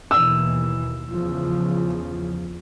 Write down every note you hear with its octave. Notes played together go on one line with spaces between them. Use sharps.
D#2 B2 E3 E6
E2 C#3 F3